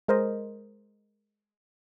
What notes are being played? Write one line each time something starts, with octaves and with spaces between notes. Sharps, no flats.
G#3 A#4 C5 D#5